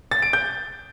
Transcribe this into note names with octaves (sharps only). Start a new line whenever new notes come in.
A6
D7
G6